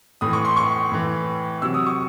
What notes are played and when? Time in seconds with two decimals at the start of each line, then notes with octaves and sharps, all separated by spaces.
0.21 A2 E3 D#6
0.33 C#6
0.45 C6
0.57 C#6
0.92 A2 E3
1.62 C3 F#3 E6
1.74 D#6
1.86 C#6